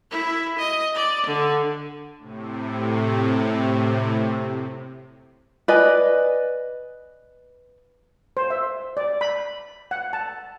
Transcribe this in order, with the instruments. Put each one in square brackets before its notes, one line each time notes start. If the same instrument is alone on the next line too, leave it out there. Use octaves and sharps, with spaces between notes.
[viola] E4
D#5
D5
D3
[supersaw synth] A2 C3
[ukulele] B4 D5 D#5 G#5
[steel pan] C5
E5
D5
B5
F#5
A5